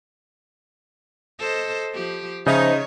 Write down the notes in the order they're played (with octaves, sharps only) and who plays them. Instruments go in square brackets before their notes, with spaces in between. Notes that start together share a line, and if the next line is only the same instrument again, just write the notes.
[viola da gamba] A4 C5 D#5
F3 G4
[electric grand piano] C#3 [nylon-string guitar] F3 C5 E5 [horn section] D#4 [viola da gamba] C#5